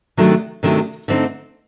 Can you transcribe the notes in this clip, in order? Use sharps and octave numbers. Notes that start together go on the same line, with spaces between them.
C3 D#3 F#3 A3 D4
C3 D#3 F#3 A3 D4
D3 A3 C4 D#4